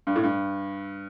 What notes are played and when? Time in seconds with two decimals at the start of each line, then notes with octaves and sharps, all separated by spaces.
0.07 G2
0.16 A2
0.23 G2